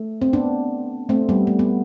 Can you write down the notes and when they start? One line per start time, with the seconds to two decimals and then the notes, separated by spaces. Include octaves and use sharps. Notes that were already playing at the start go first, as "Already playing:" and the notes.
Already playing: A3
0.22 C4
0.33 B3 D4
1.09 A3 C4
1.29 G3 B3
1.47 A3
1.59 B3